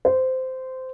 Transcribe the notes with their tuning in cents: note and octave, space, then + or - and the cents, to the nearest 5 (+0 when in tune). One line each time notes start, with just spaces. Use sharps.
C5 -15